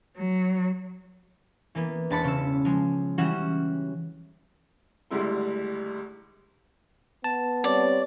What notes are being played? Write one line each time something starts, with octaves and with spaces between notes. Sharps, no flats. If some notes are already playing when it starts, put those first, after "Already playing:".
F#3
E3 A#3 B3
E1 D4 A5 B5 A6 C#7
C#3 E6
F3 G#3
E3 G3 C#4 F#4 F#5 E7
G#1 D2 G3 G#3 E4 C6
B3 A5
G3 C4 C#5 D5